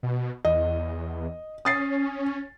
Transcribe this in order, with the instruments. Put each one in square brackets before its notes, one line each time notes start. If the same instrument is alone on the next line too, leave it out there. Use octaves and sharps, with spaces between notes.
[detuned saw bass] B2
[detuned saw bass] E2 [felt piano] D#5
[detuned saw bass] C#4 [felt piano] D#6 A6 C7